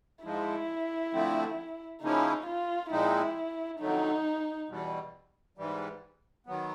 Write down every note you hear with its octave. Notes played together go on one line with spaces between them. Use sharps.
G#2 F3 G#3 E4
D3 F3 A3 C4
C#3 F3 A#3 C#4 D#4 E4
F4
A#2 F3 G#3 C4 D#4 E4
F2 D3 F#3 A3 D#4
E2 B2 G3
G#2 E3 G3
D#3 F#3 B3